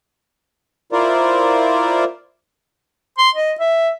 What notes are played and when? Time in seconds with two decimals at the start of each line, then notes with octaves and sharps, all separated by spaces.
0.92 E4 F4 A#4 C5 D5
3.19 C6
3.35 D#5
3.60 E5